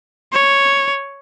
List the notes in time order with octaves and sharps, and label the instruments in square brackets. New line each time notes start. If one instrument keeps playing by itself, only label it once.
[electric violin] C#5